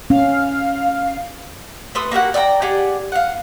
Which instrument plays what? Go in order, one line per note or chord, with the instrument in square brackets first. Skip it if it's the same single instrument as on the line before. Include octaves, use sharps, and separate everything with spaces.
[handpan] C#4 [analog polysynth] F5
[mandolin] A3 B4 C6 D#6
A#3 F#4 G4 F#5
D5 E5 G5 A#5
G4 G#4 D5 F#5
F5 F#5